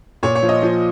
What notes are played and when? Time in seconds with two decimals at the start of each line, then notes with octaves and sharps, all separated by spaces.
0.23 A#2 C#5
0.35 C#5
0.42 F3
0.49 D#5
0.63 F3